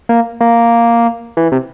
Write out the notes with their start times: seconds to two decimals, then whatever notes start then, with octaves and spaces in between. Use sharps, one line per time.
0.09 A#3
0.41 A#3
1.37 E3
1.52 C3